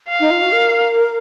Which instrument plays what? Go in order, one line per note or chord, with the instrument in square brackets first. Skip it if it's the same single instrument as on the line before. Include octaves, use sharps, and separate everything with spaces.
[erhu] F5
[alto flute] D#4
F4
F#4
A#4